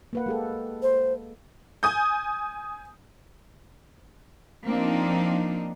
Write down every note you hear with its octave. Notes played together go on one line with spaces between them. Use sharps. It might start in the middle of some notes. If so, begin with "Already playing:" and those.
A#3 B4 F#5
G#3 G4 A4
C5
G#5 D#6 G6
F3 A#3 C4 D4 D#4